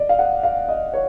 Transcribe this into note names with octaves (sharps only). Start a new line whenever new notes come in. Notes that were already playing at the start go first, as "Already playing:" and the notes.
Already playing: D5 D#5
F5
F#5
F5
D#5
C#5